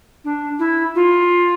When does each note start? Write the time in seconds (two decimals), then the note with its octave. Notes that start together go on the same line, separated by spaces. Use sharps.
0.24 D4
0.59 E4
0.95 F4